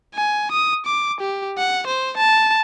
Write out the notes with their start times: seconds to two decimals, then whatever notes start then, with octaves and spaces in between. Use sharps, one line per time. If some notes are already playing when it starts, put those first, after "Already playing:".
0.15 G#5
0.52 D#6
0.86 D6
1.20 G4
1.58 F#5
1.87 C5
2.17 A5